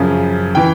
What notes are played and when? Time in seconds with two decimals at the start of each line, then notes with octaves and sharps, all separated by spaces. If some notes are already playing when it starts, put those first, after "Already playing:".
Already playing: F#2 C#3 F3
0.55 E3 G5